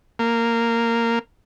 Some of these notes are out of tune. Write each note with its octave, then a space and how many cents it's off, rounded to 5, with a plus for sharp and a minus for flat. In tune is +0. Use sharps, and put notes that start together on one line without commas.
A#3 -10